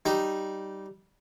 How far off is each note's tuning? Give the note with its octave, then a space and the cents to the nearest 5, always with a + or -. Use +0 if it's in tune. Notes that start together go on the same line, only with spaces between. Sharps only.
G3 -10 D#4 -10